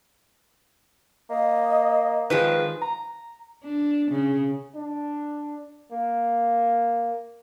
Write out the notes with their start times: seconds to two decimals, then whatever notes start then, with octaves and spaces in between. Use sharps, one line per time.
1.30 A#3 D#5
2.30 D#3 F3 G#3 B4
2.82 A#5
3.64 D4
4.11 C#3
4.76 D4
5.92 A#3